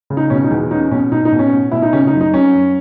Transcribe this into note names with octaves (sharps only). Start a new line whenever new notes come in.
C#3
D#4
B2 C#4
D#4
E2
C#4 D#4
B2 C#4
B2 D#4
D#4
B2
C#4
B2
B2 E4
D#4
C#3 C#4
D#4
F#2
D#4
F#3 C#4
F#2